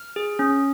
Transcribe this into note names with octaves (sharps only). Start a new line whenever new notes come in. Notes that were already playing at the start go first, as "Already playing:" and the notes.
Already playing: F6
G#4
C#4